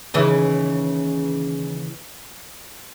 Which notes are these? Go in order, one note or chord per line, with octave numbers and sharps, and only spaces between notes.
D#2 C#3 E3